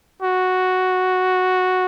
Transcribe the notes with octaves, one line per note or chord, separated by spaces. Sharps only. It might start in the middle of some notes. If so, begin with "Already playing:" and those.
F#4